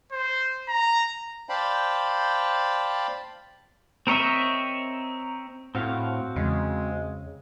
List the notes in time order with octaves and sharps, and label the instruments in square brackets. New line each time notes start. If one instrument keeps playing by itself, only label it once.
[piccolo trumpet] C5
A#5
[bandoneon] C5 D5 F5 G5 A5 B5
[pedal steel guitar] C4 A#4 C#5 D#5 E5
[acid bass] A2 [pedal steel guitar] C4 F#4 F5
[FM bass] E2 [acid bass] C#3 [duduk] G#3